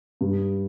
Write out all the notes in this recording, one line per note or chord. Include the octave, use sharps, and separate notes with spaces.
G2